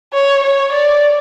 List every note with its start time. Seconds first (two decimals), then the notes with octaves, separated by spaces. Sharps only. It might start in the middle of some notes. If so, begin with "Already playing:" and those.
0.13 C#5
0.43 C#5
0.72 D5